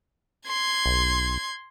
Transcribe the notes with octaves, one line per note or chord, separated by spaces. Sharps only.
C6 G#6
B1